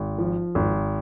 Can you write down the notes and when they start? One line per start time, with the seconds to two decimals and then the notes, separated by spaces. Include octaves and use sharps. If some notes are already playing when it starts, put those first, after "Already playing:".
Already playing: G#1
0.18 F3
0.55 G#1